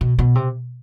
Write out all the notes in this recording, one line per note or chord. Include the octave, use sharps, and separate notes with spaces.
B2
B2
C3